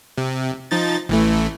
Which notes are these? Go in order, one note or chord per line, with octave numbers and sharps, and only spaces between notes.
C3
F3 D#4 A6
A1 E3 A3